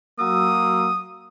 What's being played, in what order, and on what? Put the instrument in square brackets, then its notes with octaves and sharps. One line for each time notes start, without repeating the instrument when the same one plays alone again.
[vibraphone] F#3 F#4 E6 [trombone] A#3 [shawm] D#6